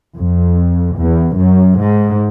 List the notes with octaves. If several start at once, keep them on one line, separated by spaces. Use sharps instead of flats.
F2
E2
F#2
G#2